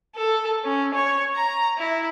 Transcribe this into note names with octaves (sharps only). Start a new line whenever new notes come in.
A4
C#4
C#5
A#5
E4